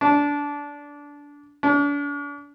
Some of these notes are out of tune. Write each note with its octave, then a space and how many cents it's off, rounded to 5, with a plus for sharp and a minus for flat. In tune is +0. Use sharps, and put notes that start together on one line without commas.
D4 -20
D4 -40